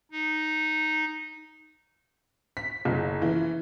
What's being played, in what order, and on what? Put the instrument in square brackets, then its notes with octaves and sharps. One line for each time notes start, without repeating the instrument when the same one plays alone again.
[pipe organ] D#4
[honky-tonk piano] B6
F#1
E3